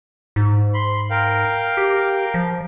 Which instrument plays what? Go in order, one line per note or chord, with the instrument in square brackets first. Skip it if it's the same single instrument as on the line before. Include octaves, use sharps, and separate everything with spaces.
[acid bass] G#2
[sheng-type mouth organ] B5 C6
A#4 F5 G5
[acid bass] G4
F3